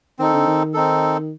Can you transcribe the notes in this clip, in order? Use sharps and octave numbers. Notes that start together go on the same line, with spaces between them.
D#3 C4 D#4 A4
D3
D#3
C4 D#4 A4